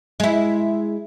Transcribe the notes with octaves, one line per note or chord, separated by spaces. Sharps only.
G#3 E4